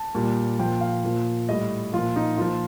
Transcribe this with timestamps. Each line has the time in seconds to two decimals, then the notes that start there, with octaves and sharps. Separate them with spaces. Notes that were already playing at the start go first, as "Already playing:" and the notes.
Already playing: A5
0.15 A#2 G3
0.59 A#2 F3 G5
0.81 F5
1.04 A#2 F3
1.48 A2 G3 D#5
1.93 A#2 F3 F4
2.16 D#4
2.37 A#2 F3 F4